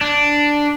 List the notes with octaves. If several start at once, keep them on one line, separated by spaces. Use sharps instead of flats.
D4